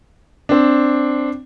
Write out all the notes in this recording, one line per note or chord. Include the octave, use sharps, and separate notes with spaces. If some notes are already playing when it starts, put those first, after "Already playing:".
C4 D4